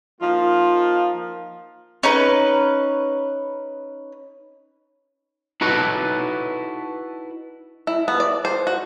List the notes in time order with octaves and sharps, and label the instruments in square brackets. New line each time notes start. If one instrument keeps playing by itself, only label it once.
[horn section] F3 A#3 D#4 F4
[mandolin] C#4 D#4 B4
[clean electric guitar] D#4 E4 F#4 A4 B4 D#5
[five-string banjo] E4
B3
D5
C5
F#4